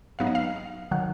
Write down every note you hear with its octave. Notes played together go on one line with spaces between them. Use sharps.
G#2 F#3 B3 D#4 F5
D#5
F5
D#3 F#3 F#5